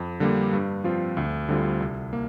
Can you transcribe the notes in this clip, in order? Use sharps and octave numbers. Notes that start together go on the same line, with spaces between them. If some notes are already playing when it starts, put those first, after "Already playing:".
Already playing: F2
D3 G3 A#3
G2
F3 C4 F4
D2
D3 G3 C4 F4
C2
A#3